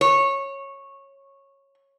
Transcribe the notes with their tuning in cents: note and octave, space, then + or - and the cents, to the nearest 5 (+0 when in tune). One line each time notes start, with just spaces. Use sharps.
C#5 -15